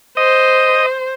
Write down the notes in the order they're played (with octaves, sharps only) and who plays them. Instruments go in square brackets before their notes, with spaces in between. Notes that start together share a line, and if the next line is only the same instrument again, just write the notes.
[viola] C5 [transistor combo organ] D#5